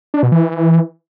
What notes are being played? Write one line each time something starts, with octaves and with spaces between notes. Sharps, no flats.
D4
B2
E3